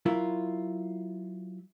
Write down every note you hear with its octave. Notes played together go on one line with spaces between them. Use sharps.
F#3 E4 F4 A#4